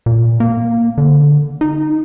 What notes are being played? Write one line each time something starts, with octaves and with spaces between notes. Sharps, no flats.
A#2
A#3
D3
D#4